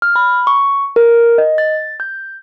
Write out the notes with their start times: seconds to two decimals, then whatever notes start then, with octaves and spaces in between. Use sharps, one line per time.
0.02 F6
0.16 B5
0.47 C#6
0.96 A#4
1.38 D#5
1.58 A6
2.00 G6